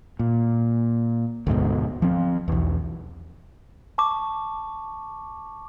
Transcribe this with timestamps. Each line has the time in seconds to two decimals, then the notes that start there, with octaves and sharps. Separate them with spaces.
0.19 A#2
1.47 D2 G#2 B2
2.02 F3 C4
2.48 B1 E2
3.98 A5 C#6 D6